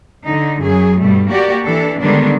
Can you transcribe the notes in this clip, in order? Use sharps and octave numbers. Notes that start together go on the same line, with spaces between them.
D3 D#4
F#2 F#3 G#4
G2 B2 G3 A3
A#3 F#4 G4 D5
E3 D4 A4
D3 D#3 G3 G#3 B3 D4